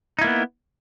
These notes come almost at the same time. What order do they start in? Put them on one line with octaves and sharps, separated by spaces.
D#4 E4 A#3 B3